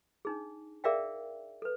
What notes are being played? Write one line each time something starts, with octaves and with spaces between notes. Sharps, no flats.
D4 D#4 G#4
G#4 A#4 D5 E5 F5 G5
A4 B4